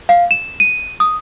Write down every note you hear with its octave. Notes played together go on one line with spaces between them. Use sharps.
F5
E7
D#7
D#6